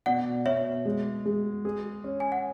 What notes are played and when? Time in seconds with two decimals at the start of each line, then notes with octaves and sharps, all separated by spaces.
0.06 B2 D5 F#5
0.46 B2 C#5 E5
0.86 G#3
1.26 G#3
1.65 G#4
2.04 C#4
2.20 G#5
2.32 F#5